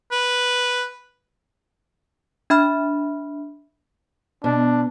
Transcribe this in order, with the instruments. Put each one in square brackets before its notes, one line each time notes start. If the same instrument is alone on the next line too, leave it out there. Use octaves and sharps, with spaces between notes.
[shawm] B4
[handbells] D4 E5 B5 F6
[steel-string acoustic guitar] B2 [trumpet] D4